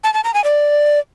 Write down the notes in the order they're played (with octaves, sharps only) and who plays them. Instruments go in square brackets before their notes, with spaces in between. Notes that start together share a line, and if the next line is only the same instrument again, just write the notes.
[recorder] A5
A5
A#5
G#5
D5